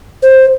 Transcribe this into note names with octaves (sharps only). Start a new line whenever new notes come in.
C5